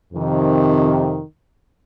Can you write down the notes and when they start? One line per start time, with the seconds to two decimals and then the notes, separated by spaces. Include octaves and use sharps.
0.13 F2 C3 D#3